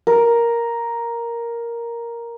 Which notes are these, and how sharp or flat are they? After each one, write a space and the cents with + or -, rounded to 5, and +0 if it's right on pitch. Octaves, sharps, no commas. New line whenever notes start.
A#4 +5